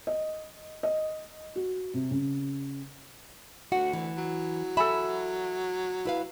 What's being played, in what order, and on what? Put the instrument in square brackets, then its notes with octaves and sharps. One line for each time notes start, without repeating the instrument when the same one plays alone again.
[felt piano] D#5
D#5
F#4
C3
C#3
[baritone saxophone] D2 [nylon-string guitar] F#4 [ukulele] F#5
[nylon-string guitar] E3
[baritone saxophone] F#3
[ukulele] A4 G#5 B5 [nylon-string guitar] E5
[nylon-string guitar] E4 B4 F5